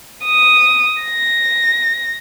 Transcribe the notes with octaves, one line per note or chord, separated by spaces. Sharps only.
D#6
A#6